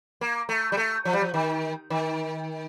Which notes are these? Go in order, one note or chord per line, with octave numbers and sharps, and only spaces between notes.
A#3
A3
G3
A3
F3
G3
F3
D#3
D#3